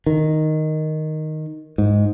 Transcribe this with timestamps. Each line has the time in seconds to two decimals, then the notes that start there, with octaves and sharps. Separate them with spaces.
0.06 D#3
1.78 G#2